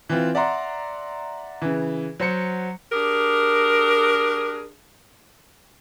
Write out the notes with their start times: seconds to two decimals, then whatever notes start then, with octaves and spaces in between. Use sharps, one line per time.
0.09 E3 C4 F4
0.35 D5 E5 F#5 A#5 C6
1.62 C#3 E3
2.20 F#3 C5 C#7
2.92 D4 G4 G#4 A#4